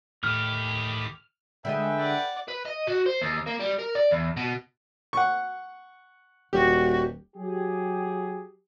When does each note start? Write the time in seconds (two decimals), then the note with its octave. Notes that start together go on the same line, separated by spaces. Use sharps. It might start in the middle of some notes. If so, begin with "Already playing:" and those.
0.24 A2 D#3 G4 B5 F6
1.65 D3 G#3 A4 B4 D#5 E5 G5
1.99 D5 F#5
2.48 B4
2.66 D#5
2.87 F#4
3.06 C5
3.22 D#2
3.47 A#3
3.60 G3
3.79 A#4
3.95 D5
4.11 E2
4.37 B2
5.13 F#5 C#6
6.53 D#1 F#4 G4
7.36 F#3 G4 G#4